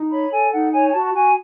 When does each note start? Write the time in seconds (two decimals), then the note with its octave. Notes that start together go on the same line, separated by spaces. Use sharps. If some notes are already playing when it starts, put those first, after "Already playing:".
Already playing: D#4
0.11 C#5 B5
0.32 A4 G#5
0.52 D#4 F#5
0.73 C#5 G#5
0.88 G#5
0.93 F#4 A5
1.04 A5
1.14 F#4 G#5